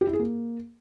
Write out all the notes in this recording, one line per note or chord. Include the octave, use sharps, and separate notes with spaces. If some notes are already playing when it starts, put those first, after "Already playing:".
G4
E4
G#4
A#3